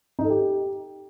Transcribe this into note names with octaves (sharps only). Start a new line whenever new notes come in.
D#4
A4
G4